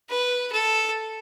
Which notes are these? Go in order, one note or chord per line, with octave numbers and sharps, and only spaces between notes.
B4
A4